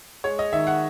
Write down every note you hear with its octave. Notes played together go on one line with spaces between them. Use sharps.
G#3 C#5
D#5
D#3 E5
F#5